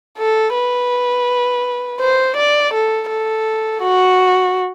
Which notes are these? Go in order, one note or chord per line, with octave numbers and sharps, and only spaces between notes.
A4
B4
C5
D5
A4
A4
F#4